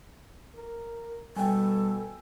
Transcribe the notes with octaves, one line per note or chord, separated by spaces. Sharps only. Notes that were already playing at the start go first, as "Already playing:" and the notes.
A#4
B2 G3 A4 G5 G#5